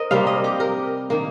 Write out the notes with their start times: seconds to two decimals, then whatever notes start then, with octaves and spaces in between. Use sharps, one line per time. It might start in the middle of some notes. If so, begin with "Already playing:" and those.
Already playing: A#4 C5 D#5
0.11 C3 G3 A#3 F5
0.27 D#5
0.44 G4
0.60 A#4
1.10 D#3 A#3